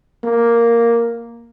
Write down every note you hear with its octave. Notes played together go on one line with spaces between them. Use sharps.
A#3